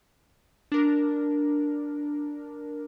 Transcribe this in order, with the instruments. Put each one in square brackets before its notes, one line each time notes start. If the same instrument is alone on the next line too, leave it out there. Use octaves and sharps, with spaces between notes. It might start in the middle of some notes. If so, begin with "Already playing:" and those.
[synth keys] D4 A#4